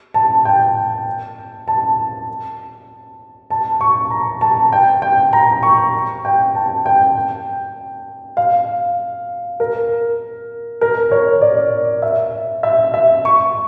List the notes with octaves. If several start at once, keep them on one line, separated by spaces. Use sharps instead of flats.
A5
G5
A5
A5
C#6
A#5
A5
G5
G5
A#5
C#6
G5
A5
G5
F5
A#4
A#4
C#5
D5
E5
E5
E5
C#6